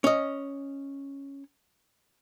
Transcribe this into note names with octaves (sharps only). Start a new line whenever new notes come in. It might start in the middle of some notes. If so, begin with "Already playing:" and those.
C#4 D#5